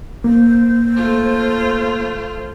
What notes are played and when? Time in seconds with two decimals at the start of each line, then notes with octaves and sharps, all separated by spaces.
0.24 A#3 C5
0.96 A3 F4